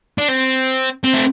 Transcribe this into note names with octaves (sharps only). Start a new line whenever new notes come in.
D4
C4
C4
A3